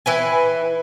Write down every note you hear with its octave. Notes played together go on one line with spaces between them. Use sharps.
E3 B4 G#5